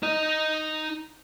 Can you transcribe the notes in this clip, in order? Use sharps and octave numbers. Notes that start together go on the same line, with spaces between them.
D#4 D#5